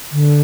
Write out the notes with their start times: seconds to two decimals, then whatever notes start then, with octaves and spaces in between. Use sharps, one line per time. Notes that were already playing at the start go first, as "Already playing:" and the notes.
0.12 D3